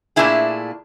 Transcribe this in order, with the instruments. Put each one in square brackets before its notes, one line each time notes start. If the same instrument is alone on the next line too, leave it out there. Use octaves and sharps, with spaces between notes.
[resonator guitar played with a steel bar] A#2 F3 A3 D4 E4 G#4